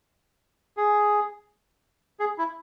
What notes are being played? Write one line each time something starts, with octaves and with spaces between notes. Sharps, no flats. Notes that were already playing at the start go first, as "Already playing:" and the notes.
G#4
G#4
E4